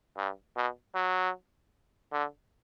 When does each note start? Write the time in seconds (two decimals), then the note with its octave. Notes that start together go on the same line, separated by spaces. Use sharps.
0.17 G2
0.56 B2
0.95 F#3
2.12 D3